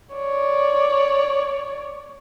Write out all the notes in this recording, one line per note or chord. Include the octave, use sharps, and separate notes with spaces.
C#5 D5